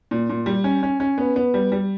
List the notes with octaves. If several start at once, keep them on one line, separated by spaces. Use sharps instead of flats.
A#2
A#2
G3
C#4
C#4
C#4
B3
B3
G3
G3